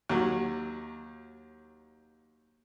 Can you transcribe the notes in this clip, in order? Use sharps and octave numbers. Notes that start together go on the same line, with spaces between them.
D#2 F#3